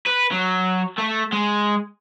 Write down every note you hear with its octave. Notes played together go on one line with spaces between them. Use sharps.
B4
F#3
A3
G#3